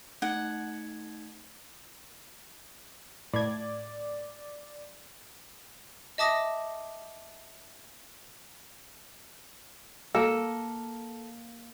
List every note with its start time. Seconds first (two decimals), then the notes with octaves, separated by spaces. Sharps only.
0.22 A3 D#4 F#5 G#6
3.33 A2 D5 G#6
6.18 D#5 E5 A5 D6 D#6 A#6
10.15 A#3 A4